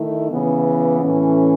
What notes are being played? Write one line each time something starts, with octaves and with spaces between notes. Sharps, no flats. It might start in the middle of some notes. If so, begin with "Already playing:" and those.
Already playing: D#3 A3 E4
C#3 E3 B3
A2 E3 A3 C#4